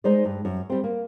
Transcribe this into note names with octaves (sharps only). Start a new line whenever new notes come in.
G#3 D#4 C5 D5
G2
F#2
G3 C4
A#3